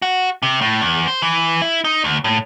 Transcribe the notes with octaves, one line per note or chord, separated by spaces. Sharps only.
F#4
C3
A2
E2
C5
E3
E4
D#4
D2
A2